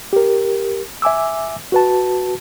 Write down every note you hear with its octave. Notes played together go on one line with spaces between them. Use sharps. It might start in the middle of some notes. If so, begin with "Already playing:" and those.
G4 A#4
E5 G#5 D6 E6
F#4 B4 A5